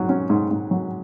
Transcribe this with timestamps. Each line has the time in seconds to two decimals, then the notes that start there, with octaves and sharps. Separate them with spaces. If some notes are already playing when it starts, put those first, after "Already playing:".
Already playing: G#2 F#3
0.09 C#4
0.30 G#2
0.51 G#2
0.71 F#3